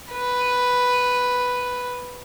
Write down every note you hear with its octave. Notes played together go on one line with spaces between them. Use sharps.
B4